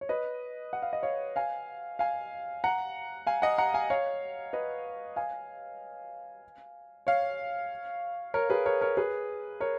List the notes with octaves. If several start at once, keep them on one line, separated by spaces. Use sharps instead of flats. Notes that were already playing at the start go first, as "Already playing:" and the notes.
C#5
B4 D#5
F#5
F5
D#5
C#5 F5
F5 G#5
F5 G#5
F#5 A#5
F5 G#5
D#5 F#5
F#5 A#5
F5 G#5
C#5 F5
B4 D#5
F5 G#5
C#5 F5
A#4 C#5
G#4 B4
A#4 C#5
A#4 C#5
G#4 B4
A#4 C#5